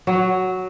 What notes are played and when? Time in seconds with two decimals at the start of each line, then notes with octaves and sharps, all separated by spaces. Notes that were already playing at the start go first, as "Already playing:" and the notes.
0.07 F#3